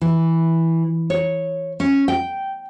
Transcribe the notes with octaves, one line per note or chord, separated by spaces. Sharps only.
E3
C#5
C#4
G5